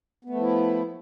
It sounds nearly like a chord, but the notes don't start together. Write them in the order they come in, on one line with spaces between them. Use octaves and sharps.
B3 A3 F3 E4